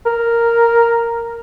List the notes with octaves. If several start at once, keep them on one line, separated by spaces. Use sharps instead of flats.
A#4